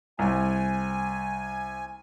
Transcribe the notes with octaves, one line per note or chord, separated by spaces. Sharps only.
C2 G#5